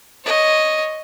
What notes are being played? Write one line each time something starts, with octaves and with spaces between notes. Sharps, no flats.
C#5 D#5